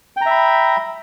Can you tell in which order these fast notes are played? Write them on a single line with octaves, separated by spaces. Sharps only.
G5 A#5 E5 B5